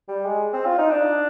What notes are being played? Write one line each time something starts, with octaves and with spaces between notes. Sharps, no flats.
G3
G#3
C4
F4
D#4
D4